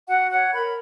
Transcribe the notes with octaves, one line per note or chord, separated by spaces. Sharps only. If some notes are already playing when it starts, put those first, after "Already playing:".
F#4 F#5
C#5 F#5
A#4 B5